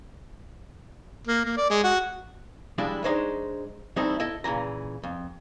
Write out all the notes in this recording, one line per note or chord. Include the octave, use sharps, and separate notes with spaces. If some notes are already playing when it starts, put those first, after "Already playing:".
A#3
A#3
D5
G#3
F#4
F3 G3 G#3 D4 E4
G#3 D4 D#4 C5 C#5
E3 G3 A3 C4 D#4 E4
E4 A4 D#5
A#2 C#3 E3 A#5
F2